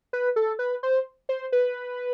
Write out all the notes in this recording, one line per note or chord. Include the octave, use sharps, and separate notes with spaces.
B4
A4
B4
C5
C5
B4